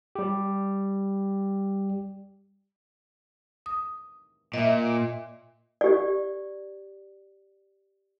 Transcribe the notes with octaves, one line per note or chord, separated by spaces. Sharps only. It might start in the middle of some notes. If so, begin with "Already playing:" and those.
G3 G4
D#6
A#2 D#5 E5
G4 D5